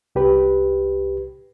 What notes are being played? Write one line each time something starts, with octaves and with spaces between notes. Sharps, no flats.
C2 G4 B4